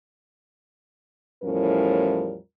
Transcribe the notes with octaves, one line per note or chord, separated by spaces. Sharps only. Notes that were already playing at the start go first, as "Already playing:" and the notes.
E2 A2 F3 G3 C#4 A#4